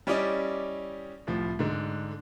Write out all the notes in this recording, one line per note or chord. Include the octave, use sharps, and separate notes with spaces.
G3 C#4 E4 G4 D5 D#5
C2 A2 F3
G#2 D3